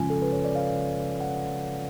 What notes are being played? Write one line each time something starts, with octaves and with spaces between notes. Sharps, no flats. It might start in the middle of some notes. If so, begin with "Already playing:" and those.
Already playing: C#3 F3 G#3 C#4 F4 G#5
A4
B4
C#5
D5
F5
F#5